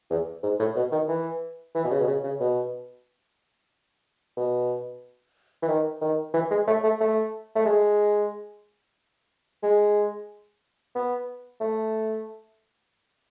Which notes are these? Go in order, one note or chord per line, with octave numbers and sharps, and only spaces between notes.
E2
G#2
A2
B2
D#3
E3
E3
B2
C#3
B2
C#3
C#3
B2
B2
E3
D#3
D#3
E3
G#3
A3
A3
A3
A3
G#3
G#3
B3
A3